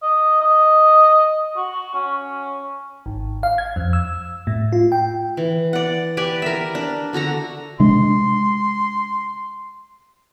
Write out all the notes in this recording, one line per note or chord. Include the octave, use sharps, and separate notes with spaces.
D#5
D#5
F#4
C#4
G#1
F5
G#6
F2
E6
A2
F4
G5
E3
D5 F#5
G4 B4 D5 G#5
A#4 E5
D4
D3 F#4 A4 A#5
C3 G#3 D4 C6